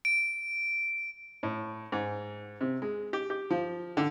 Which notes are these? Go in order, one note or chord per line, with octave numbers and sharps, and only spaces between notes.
D7
A2
G#2
C3
G#3
G4
G4
F3
D3